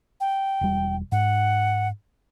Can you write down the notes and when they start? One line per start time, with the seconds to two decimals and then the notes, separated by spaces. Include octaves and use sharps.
0.20 G5
0.61 E1 G3
1.12 G#2 F#5